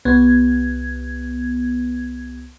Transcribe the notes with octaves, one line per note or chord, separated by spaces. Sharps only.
C2 B3 G#6